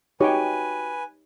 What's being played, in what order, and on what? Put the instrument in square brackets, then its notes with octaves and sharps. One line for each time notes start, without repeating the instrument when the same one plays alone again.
[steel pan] D#4 G4 C#5 [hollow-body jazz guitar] F#4 G5 [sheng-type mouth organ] B4 G#5